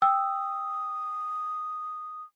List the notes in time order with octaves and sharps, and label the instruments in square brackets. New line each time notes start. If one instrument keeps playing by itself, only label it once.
[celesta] G5 E6 [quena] D#6